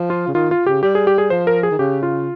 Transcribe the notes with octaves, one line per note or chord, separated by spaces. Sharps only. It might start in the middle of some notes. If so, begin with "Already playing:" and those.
Already playing: F3
F4
C#3
D#3 F4
F4
C#3 G4
G3 G4
G#4
G4
G#4
F3 C5
A#4
G#4
D#3
C#3 G4
F4